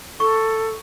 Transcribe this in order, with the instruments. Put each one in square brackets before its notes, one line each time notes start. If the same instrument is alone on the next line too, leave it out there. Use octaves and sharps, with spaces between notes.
[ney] A4 [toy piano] C#6